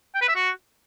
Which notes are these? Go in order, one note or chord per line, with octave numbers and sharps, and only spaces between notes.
G5
B4
E5
F#4